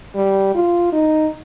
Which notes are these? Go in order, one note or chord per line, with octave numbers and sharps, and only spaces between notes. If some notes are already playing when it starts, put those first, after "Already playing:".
G3
F4
D#4